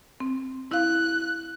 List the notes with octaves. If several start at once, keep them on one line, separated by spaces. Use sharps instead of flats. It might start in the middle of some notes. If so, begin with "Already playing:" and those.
C4
E4 F5 F#6